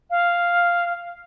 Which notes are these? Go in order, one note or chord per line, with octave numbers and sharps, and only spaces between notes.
F5